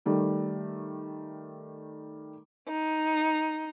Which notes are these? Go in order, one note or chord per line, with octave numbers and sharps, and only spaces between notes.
D#3 G3 A3
D#4